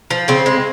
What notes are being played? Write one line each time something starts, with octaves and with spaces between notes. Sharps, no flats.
F3
C#3 C4
G#3